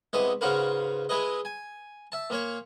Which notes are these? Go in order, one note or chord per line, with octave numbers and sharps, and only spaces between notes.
C2 G#3 B3 D#5 E5
G#2 C#3 F4 F#4 A#4 B4
G#3 E4 G#4 B4 D#5
G#5
E5 A5
A#2 A#3 C#5